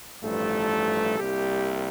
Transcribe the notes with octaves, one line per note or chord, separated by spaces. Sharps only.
A1 G2 F3 A3 A4
C2 C3 G3 A#3 G4